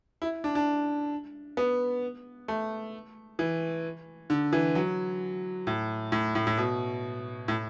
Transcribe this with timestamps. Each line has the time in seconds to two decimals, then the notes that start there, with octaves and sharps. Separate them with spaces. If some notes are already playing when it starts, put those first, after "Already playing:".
0.22 E4
0.44 D4
0.55 D4
1.57 B3
2.48 A3
3.39 E3
4.30 D3
4.53 E3
4.75 F#3
5.67 A2
6.12 A2
6.35 A2
6.47 A2
6.58 B2
7.48 A2